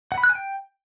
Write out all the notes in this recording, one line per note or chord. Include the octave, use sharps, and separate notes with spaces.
F#5
B5
F#6
G#5
G5